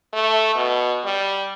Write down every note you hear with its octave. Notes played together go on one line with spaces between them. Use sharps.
A3
B2
G3